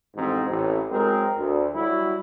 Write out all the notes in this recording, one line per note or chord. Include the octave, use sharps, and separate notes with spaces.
A1 F2 G#2 C4
A1
F#3 G#3 C4 A#4
D2
F#3 G3 E4 F#4